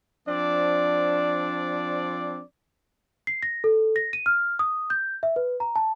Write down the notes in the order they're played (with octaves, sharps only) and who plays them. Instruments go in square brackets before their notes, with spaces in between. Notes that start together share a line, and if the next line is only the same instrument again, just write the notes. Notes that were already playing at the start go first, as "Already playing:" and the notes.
[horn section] F3 C4 D4 D5
[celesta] C7
A#6
A4
A#6
D#7
F6
D#6
G6
E5
B4
A#5
A5